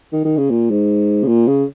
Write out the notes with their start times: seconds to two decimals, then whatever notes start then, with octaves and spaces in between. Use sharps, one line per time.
0.12 D#3
0.25 D#3
0.37 C#3
0.50 A#2
0.70 G#2
1.23 C#3
1.27 A#2
1.47 C#3